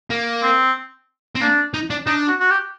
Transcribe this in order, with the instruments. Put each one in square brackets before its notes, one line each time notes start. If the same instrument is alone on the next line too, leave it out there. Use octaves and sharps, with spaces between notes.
[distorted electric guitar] A#3
[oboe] C4
[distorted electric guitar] C4
[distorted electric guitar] A#3 [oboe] D4
[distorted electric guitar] D#4
D4
[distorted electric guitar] D4 [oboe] D#4
[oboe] F#4
F#4
G4